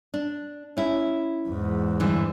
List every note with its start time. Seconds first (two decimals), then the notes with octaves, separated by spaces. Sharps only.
0.14 D4
0.77 C#4 E4
1.49 E2 G#2
2.00 G2 D3 E3